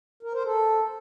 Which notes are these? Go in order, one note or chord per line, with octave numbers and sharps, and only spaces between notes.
A#4
C5
A4